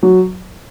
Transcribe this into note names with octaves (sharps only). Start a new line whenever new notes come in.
F#3